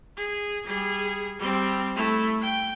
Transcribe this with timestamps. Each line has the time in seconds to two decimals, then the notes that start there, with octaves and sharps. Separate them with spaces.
0.17 G#4
0.65 G3 G#4
1.39 G3 C4
1.95 A3 E4
2.42 G5